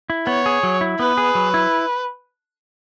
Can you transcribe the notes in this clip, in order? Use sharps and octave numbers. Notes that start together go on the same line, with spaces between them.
E4
B3 C#5
G#4
F#3
E4
B3 B4
G#4
F#3
E4